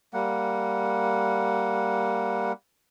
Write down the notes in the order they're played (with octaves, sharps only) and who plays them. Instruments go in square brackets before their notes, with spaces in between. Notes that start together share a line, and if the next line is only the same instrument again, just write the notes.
[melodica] G3 A#3 F#5